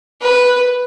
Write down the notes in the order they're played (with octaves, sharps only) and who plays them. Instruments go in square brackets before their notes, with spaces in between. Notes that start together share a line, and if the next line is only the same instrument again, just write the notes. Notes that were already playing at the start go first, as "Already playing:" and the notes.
[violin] B4